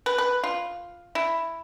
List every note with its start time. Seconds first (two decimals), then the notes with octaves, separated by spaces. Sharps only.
0.06 B4
0.18 B4
0.44 F4
1.15 E4